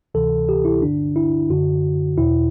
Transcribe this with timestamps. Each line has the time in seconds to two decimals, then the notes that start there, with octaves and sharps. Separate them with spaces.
0.14 D2 C3 E3 A4
0.49 G4
0.65 E4
0.82 G2 D3 D4
1.16 E4
1.50 F#2 D3 F#4
2.18 E2 B2 E4